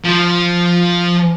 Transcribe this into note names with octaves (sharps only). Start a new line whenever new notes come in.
F3 C5